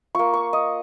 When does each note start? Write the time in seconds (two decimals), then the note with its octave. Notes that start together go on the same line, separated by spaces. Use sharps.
0.15 A#3 F4 C#6
0.34 C#6
0.53 D#5